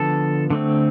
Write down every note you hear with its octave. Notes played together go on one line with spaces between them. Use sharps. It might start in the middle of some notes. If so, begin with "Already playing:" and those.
Already playing: D3 F3 B3 A4
D3 A3 C4